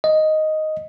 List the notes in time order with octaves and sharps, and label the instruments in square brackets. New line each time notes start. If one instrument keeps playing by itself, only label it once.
[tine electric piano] D#5